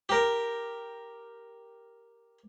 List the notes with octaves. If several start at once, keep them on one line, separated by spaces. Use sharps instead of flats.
G4 A#4